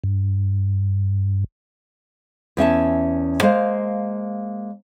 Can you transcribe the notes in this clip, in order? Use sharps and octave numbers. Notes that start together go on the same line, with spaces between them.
G2
E2 C#4 E5 A5
G#3 A#3 C5 F5